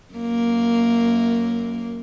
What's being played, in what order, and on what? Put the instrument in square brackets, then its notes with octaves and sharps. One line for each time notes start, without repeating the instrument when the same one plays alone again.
[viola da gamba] F#2 A#3